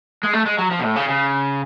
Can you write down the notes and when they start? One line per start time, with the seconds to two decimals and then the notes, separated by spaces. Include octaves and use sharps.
0.23 G#3
0.33 A3
0.46 G#3
0.58 F#3
0.71 F3
0.79 B2
0.84 A2
0.96 C#3
1.08 C#3